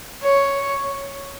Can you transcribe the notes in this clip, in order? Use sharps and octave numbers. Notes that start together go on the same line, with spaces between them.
C#5